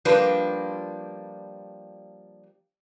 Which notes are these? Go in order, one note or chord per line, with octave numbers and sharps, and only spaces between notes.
F3 G3 A#3 D4 B4